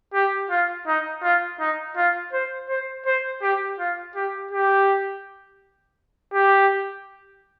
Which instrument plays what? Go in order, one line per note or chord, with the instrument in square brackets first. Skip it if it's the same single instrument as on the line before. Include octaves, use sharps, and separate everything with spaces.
[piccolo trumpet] G4
F4
D#4
F4
D#4
F4
C5
C5
C5
G4
F4
G4
G4
G4